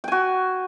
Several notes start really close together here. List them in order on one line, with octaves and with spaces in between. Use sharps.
G5 G#5 F#4